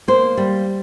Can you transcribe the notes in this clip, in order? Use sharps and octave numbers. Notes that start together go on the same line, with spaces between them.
A#3 C5
G3